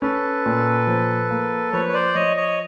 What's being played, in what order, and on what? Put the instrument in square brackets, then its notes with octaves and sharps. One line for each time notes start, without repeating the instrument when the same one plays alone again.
[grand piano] C#4 [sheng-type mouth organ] A4 B4
[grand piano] A#2
F3
A#3
[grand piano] F3 [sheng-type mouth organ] B4 C#5
[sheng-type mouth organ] C#5
C5 D5
[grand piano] F3 [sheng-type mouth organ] C#5 D#5
[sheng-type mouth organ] C#5 D#5